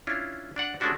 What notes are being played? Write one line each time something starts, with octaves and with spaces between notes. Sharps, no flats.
C#4 D4 E4 F4
D4 D5 F#5
G#3 A3 C#4 D4 F#4 G4